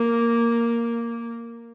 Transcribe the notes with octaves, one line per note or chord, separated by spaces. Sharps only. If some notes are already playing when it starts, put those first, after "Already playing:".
Already playing: A#3